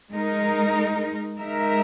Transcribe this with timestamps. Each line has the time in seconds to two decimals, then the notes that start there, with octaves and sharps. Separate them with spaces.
0.11 G#3 D#4 A#4
1.40 G#3 D#4 A#4 E5